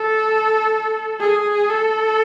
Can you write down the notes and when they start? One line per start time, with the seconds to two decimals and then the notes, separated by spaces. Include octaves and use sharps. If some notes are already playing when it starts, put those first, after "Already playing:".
Already playing: A4
1.20 G#4
1.69 A4